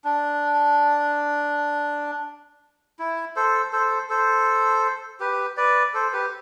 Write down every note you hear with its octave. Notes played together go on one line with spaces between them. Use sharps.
D4
E4
A4 C5
A4 C5
A4 C5
G4 B4
B4 D5
A4 C5
G4 B4